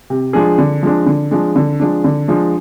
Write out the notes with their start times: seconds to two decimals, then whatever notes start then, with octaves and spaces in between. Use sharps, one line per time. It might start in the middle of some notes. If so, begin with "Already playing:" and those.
0.10 C3
0.33 F3 G#3 D4 G#4
0.58 D3
0.83 F3 G#3 D4
1.06 D3
1.31 F3 G#3 D4
1.56 D3
1.80 F3 G#3 D4
2.04 D3
2.28 F3 G#3 D4